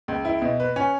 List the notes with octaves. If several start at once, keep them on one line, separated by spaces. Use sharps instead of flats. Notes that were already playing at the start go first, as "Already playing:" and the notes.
C#2
E4
B2
B4
C#4